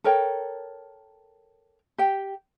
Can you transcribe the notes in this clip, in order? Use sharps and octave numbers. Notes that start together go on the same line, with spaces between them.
A4 A#4 C#5 G5
G4 G5